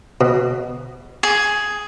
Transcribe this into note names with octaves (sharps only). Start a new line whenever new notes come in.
B2
G#4